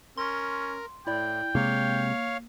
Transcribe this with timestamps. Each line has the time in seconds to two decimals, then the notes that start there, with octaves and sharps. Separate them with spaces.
0.17 C#4 A#4 C6
1.07 A2 E4 D5 G5
1.55 C3 G#3 A#3 C#5 F5